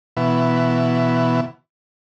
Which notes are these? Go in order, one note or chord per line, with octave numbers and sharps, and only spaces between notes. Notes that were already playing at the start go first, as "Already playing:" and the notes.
B2 E3